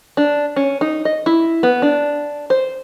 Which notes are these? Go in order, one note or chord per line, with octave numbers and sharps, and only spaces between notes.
D4
C#4
D#4
D#5
E4
B3
D4
C5